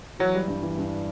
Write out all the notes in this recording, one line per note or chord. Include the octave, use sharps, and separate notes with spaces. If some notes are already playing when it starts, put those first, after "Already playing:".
E3 F#3
G3
G2
E3
G2